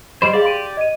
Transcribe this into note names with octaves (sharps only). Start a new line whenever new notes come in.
G3 C5 D#5 B5 E7
G4 G#4 D5 F5
C6 D7 D#7
D#5 D#7